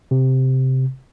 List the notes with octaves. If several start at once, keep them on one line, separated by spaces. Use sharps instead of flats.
C3